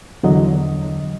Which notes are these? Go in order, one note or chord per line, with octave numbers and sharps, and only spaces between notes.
E2 D3 F#3 D#5